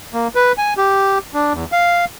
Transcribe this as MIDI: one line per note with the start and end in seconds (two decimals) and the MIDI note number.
0.14 0.28 58
0.35 0.52 71
0.58 0.74 80
0.77 1.18 67
1.34 1.53 62
1.54 1.65 40
1.72 2.05 77